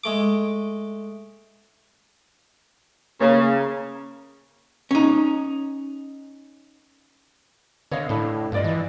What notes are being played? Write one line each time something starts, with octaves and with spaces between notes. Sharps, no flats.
G#3 A3 D6
C#3 A#3
C#4 D#4
D3 C#5 D#5 F5
A2 D4 E4 A4
G2 F4 D5 D#5
E3